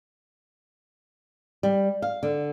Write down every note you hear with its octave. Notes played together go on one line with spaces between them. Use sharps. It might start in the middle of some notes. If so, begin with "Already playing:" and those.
G3
F5
D3